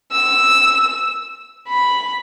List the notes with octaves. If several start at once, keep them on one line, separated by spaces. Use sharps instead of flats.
E6
B5